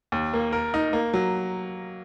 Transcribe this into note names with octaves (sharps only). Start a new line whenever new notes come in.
D#2
A#3
A#4
D#4
A#3
F#3